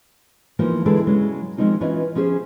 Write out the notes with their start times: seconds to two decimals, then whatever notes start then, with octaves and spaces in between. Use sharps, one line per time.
0.59 E3 F3 A#3 D#4 F4
0.86 D3 E3 G#3 G#4 A4
1.07 C#3 F#3 G#3 C#4
1.57 D#3 F3 G#3 C4 D#4 F4
1.81 E3 C#4 D#4 F4 B4 D#5
2.15 F3 C#4 F4 G#4 C5